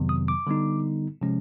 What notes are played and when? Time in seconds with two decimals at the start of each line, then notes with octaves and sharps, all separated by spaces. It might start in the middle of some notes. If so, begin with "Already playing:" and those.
Already playing: F2 C3 D#3 F#3 B3
0.09 D#6
0.28 D6
0.47 D3 G3 B3 D#4
1.22 C3 F3 G#3 C#4